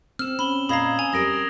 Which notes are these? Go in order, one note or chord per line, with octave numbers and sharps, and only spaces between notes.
C4 E6 F6 E7
C#4 B5 F#7 G7
A#2 D#5 F5 A#5 B5 D#6 G#6 C7
G#5 F7
G3 G4 A#4 D#6 A#6 D7